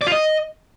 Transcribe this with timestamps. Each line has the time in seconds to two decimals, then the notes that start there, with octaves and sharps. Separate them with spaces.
0.01 D5
0.07 F4
0.12 D#5